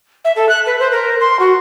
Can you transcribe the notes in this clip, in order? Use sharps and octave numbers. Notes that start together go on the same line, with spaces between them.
E5
A4
F#6
B4
C5
A#4
C6
F#4